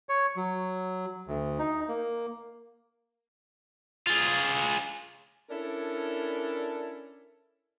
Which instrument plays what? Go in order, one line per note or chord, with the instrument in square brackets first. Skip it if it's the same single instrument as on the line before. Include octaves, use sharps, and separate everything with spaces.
[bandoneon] C#5
F#3
D2
D#4
A#3
[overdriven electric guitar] F4 G#4
[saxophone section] C#4 D4 E4 A4 A#4